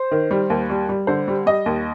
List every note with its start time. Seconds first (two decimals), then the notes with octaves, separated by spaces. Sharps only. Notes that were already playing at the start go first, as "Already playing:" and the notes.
Already playing: C5
0.11 D#3
0.31 G3
0.50 D#2
0.70 G3
0.89 G3
1.07 D3 C5
1.28 G3
1.46 G3 D#5
1.66 D#2